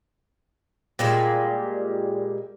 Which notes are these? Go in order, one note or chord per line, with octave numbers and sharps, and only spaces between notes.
A#2 G3 G#3